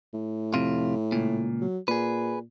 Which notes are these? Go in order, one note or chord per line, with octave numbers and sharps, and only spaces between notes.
A2
F2 C3 F4
C#2 A#2
F#3
A#2 G#4 B4